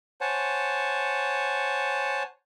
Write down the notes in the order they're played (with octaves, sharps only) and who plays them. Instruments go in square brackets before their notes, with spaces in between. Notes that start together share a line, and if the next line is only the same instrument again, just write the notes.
[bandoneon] C5 C#5 F#5 G#5 A5